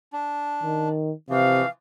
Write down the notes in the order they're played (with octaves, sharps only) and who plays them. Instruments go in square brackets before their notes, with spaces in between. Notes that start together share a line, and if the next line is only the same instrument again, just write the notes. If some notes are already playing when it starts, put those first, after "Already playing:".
[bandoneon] D4
[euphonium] D#3
[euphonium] C3 [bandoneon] E3 F3 [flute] F5